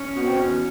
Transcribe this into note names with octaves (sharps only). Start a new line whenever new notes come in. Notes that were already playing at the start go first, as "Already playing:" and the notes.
Already playing: C#4
B2 B3
C4
E2 C#4